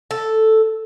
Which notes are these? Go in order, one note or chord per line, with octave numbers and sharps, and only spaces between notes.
A4